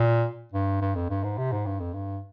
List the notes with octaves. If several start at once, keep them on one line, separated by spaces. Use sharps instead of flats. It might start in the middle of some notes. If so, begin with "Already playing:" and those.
Already playing: A#2
G2
G2
F2
G2
G#2
C3
G#2
G2
F2
G2